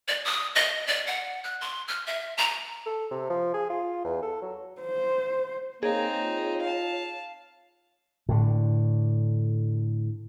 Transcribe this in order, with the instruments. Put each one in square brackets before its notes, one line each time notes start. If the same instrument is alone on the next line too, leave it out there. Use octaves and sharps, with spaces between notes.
[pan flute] D5
D#6
D#5
D5
F#5
F#6
C6
F6
E5
A#5
[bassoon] A4
C3
F3
G#4
F4
E2
A4
F#3
[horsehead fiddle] C5
[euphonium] A#3 [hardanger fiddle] C4 D#4 [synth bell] G#4 [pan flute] C#5
[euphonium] F4
[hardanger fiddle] F5 A5
[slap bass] A2 D3